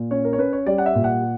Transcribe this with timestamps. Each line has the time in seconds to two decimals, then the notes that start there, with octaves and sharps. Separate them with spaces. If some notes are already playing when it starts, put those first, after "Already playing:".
Already playing: A#2
0.11 C#4 C#5
0.25 A#4
0.33 C#5
0.38 C#4 B4
0.53 C#5
0.66 G3 D5
0.78 F#5
0.86 E5
0.95 A#2
1.04 F#5